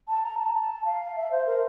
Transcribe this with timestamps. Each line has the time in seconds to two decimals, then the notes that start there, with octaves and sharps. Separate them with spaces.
0.08 A5
0.24 A#5
0.39 A5
0.54 A5
0.85 F5
1.16 E5
1.31 C5
1.46 A#4